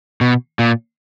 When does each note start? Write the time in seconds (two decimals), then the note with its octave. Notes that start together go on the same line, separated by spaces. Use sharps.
0.21 B2
0.59 A#2